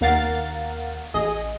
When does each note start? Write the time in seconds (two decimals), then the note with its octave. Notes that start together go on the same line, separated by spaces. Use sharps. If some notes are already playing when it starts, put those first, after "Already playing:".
0.01 D#2 A#3 A#4 F5 F#5 A6
1.14 A1 G#4 D#5